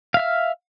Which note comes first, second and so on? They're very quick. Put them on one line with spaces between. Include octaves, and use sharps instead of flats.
F5 E5 F6